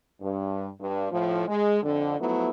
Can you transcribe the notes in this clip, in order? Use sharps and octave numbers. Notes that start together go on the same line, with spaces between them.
G2
G2
A2 F3
G#3
F2 D3
F3 F#3 A3 B3 E4